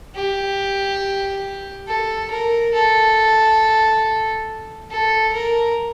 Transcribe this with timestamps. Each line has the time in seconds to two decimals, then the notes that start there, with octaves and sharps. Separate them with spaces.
0.16 G4
1.88 A4
2.31 A#4
2.74 A4
4.90 A4
5.34 A#4